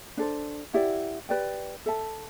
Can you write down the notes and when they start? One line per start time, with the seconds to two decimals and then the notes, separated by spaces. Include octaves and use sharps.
0.17 D4 A4 C5
0.73 E4 G4 D5 F#5
1.29 G4 B4 D5 G5
1.86 A4 E5 A5